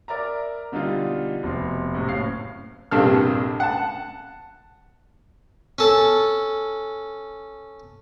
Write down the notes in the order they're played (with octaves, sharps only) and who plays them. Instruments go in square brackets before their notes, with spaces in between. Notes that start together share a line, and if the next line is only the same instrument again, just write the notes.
[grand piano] A#4 D5 E5 A#5
B2 D3 G3 D#4 F4
F1 B2 C6
F#2 A2 C3
F#1 A2 C#4 F5 C7
[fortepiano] A#1 G2 C3 A4 F6
F#5 A5
[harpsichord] C#4 A4